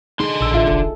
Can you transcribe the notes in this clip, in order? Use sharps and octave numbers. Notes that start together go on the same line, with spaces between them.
D3 D#4 G#4 C6
A#1 E6
A1 F4 E5
E1 A4